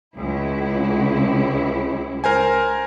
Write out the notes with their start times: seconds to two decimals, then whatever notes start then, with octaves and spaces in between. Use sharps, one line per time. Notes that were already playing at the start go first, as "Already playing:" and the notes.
0.17 C#2 E4
2.24 A#4 C5 G#5